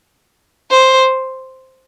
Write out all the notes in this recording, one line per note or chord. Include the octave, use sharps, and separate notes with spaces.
C5